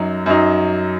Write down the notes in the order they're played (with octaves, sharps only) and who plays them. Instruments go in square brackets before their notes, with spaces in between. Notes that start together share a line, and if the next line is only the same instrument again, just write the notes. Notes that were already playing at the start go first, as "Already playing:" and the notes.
Already playing: [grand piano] F#2 F#3 D#4
F#2 F#3 D#4